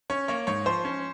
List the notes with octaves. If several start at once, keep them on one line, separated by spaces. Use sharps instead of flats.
C#4 C#5
A#3 C#5
G#2 C#5
F3 C5
C#4